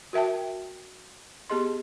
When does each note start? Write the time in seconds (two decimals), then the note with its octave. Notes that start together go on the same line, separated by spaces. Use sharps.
0.13 F#4 A#4 E5 G5 A5
1.50 B3 G4 G#4 D#5 C6